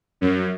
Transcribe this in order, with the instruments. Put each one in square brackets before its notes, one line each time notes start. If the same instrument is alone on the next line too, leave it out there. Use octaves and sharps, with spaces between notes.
[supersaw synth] F#2